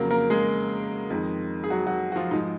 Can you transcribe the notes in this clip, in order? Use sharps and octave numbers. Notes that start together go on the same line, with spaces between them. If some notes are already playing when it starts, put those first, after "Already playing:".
Already playing: F2 C#3 F#3 A#3
A#3 A#4
G#3 G#4
F2 D#3 G#3
G#4
F#3 F#4
F#3 F#4
F#4
F3 F4
G#2 F3 G#3 D#4